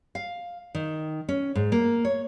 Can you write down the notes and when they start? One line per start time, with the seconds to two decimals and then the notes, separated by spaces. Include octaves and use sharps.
0.15 F5
0.75 D#3
1.29 C#4
1.55 G#2
1.72 A#3
2.05 C#5